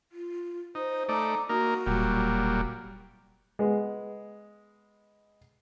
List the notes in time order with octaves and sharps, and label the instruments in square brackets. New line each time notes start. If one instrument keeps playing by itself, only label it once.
[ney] F4
[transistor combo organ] D#4 [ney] C5
[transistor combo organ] A3 D#4 D5 [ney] A#5
[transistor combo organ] A#3 D#4 A#4 [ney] F#4
[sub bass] E1 [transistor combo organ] A#2 F#3 G3
[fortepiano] G#3 B3